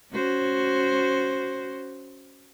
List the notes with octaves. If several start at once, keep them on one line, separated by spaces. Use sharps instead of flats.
C#4 F#4 C5